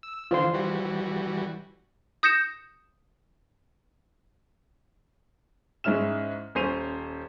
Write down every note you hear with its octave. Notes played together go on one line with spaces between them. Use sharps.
E6
D3 E3 F4 C5 C6
E3 G3 F#4
D#6 G6 A#6 C#7 E7
G#2 G#3 C#4 E4 F6 E7
D#1 C#4 C5 C7 D#7 F7